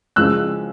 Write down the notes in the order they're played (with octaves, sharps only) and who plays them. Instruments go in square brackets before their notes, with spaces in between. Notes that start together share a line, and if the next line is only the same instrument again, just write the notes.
[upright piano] C#3 F3 G#3 E6 F#6